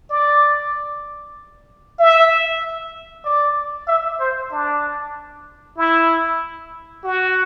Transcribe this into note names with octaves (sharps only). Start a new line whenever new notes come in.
D5
E5
D5
E5
C5
D4
E4
F#4